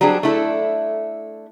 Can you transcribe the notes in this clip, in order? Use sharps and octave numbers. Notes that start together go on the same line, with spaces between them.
F#3 G3 C4 D4 G#4
A3 D4 E4 A4